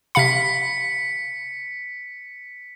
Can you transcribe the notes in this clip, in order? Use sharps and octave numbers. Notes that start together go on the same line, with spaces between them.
C3 F5 B5 B6 C#7